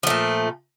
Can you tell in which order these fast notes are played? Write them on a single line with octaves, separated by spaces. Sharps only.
F3 A3 A#2